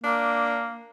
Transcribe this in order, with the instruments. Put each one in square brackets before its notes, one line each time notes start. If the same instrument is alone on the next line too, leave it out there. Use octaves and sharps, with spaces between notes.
[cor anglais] A#3 [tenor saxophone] D4